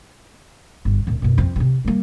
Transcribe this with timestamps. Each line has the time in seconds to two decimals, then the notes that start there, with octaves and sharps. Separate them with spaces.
0.85 G1
1.07 D1 A#2
1.22 F#2 B2
1.38 F2 C4
1.56 A1 C3
1.85 G3 A#3